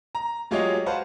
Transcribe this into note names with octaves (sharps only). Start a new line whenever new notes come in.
A#5
F#3 G#3 F4 G4 C#5 D#5
F#4 B4 C5 F5 F#5 A5